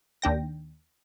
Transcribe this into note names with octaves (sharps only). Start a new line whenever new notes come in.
D#2 D4 G5 A#6